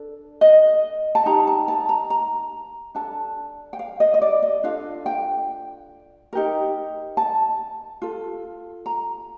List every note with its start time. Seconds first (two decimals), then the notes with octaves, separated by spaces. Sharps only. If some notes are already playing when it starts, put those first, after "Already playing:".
Already playing: D4 A4
0.41 D#5
1.15 A5
1.26 D#4 G4 A#4 A#5
1.47 A5
1.68 A5
1.89 A#5
2.10 A#5
2.95 D4 A4 A5
3.73 G5
3.79 F5
4.00 D#5
4.14 D#5
4.22 D5
4.42 D#5
4.63 D4 F4 A4 F5
5.06 G5
6.33 D#4 G4 A#4
7.17 A5
8.02 F4 A4
8.86 A#5